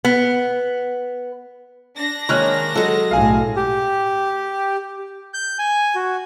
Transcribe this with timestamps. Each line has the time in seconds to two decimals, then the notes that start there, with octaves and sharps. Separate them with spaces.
0.04 B3
1.98 D4 A#6
2.29 D#3 G#3 A#3 C#5 F6 F#6
2.75 F#3 G#3 A4
3.11 B1 A2 F5 G#5
3.56 G4
5.34 G6
5.59 G#5
5.95 F#4